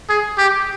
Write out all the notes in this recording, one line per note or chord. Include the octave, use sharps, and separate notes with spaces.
G#4
G4